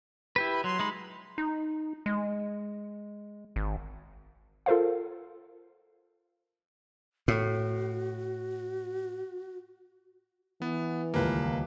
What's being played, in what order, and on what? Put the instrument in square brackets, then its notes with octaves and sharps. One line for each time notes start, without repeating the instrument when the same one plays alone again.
[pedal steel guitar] E4 G4 B4
[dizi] B5
[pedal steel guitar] F#3 [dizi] C6
[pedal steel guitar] G#3 D#4 B5
[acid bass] D#4
G#3
G#1
[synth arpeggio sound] F4 A4 A#4 C5 F5
[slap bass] A2 [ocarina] F#4
[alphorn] E3 [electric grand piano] B3
[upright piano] D#1 C#2 [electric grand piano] A#3 B4